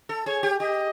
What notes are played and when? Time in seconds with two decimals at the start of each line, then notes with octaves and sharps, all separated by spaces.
0.09 A4
0.26 G#4 C#5
0.43 G4
0.59 G4 D#5